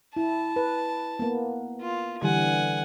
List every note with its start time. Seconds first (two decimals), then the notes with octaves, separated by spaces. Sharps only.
0.17 E4 A5
0.56 B4
1.19 A#3 B3
1.82 F4
2.22 D3 E3 G3 F#5 G#5